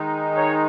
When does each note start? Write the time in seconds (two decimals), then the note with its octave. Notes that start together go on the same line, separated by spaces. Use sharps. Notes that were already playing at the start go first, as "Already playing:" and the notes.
Already playing: D#3 G#3 D#4
0.37 C#5